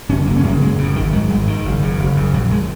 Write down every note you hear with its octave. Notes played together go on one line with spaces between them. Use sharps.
F#2 C#3 C#4
F#1 A#3
C#4
F#2 C#3 A#3
F#1 G#3
F#2 C#3
G#1 D#3
G#2 F#3
G#1 G#3
G#2 D#3
F#1
F#2 C#3
F#1
F#2 C#3
A#1 F#3
G#3